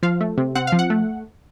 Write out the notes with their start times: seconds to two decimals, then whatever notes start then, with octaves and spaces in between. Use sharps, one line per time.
0.03 F3 F5
0.21 A3
0.37 C3
0.55 C4 F#5
0.67 F5
0.72 F3
0.79 F#5
0.90 A3